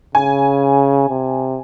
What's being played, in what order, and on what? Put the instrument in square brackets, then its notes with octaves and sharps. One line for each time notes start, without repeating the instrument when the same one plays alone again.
[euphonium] C#3 [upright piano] G#5
[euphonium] C3